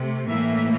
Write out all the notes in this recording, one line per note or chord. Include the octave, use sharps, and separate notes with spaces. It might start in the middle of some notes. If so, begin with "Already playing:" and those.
Already playing: C3 A3
A2 E3 A#3 E5